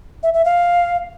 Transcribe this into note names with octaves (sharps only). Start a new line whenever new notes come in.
E5
E5
F5